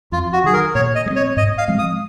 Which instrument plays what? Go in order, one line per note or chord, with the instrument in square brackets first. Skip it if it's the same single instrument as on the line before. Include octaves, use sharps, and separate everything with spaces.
[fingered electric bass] F2 [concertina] F4
[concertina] F#4
[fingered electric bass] D#3 F#3 [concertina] G#4
[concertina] A#4
[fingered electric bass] A#2 [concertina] C#5
[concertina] D#5
[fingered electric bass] G#3
C4
[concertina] C#5
[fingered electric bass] G#2 [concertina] D#5
[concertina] F5
[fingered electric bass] F3 G#3 C4
[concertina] D#6